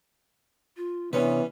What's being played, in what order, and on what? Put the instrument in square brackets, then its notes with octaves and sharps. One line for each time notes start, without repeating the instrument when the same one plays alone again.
[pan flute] F4
[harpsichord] G2 C#4 B4 [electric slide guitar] C3 C#5 [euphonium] E3 [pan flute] B3